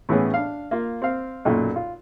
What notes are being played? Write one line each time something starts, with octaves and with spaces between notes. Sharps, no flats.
A2 E3 A3 B3 C#4 G#4
D4 F5
A#3 F4
C4 F5
B1 F#2 A#2
F4